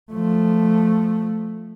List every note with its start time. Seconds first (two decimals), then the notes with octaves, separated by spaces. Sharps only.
0.12 F3 A3